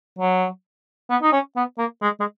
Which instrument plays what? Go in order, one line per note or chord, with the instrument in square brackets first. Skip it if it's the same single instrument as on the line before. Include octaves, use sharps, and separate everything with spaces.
[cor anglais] F#3
B3
D#4
C#4
B3
A#3
G#3
G#3